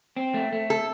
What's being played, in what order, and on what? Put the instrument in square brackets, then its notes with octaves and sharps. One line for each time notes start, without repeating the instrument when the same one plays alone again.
[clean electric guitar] C4
A3
A3
[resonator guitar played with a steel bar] A4